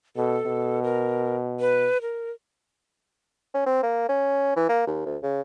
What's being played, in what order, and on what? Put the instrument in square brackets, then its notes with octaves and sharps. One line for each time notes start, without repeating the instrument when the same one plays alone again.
[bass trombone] B2 [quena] A4
[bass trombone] B2
[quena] A#4
B4
A#4
[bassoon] C#4
C4
A#3
C#4
E3
A#3
D#2
D2
C#3